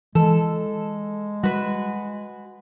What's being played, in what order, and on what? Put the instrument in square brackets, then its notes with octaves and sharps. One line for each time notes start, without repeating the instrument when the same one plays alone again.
[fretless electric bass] E3 [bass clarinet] G#3 [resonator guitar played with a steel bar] A4
[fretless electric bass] G3 [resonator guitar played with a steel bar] F#4 B4